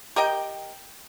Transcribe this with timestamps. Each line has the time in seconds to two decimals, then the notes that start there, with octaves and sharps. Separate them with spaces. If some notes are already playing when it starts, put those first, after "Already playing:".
0.16 G4 A#4 D#5 G5